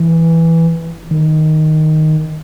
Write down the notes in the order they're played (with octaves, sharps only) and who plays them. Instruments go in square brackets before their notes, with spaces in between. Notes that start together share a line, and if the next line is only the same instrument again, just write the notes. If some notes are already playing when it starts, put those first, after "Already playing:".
Already playing: [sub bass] E3
D#3